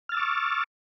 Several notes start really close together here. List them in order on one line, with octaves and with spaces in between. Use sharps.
F6 A6 E6 D6 C#6